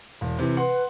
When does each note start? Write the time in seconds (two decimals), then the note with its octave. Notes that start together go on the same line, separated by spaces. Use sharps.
0.21 E1
0.39 C3 E3
0.57 B4 F#5 C6